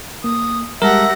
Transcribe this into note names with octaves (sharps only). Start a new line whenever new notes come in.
A#3 D#6
G3 G#3 G4 A#4 E5 F#5 A5 A#6